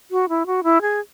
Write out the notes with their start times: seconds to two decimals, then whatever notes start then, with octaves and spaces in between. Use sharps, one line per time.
0.11 F#4
0.29 E4
0.46 F#4
0.64 E4
0.81 G#4